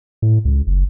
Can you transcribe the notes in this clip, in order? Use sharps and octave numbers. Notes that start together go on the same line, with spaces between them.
A2
C#2
F#1